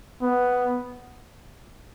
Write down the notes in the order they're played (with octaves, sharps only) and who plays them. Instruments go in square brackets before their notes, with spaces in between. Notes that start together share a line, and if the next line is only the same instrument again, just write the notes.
[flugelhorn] B3